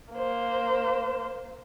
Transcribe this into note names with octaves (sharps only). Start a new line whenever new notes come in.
A#3 C5